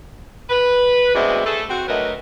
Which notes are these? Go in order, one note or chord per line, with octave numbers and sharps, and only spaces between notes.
B4
D2 B2 G#3 C4 D5 E5
A3 G#4 A4
C4 F#4
D2 F#3 A3 A#4 B4 D#5